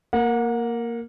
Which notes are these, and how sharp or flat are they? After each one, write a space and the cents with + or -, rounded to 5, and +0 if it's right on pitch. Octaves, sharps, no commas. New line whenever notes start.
A#3 +0 F#5 -35